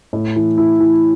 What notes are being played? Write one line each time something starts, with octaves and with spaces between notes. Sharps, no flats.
A2
E3
E4
E3